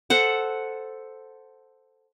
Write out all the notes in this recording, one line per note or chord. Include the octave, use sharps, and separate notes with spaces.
A4 C5 F#5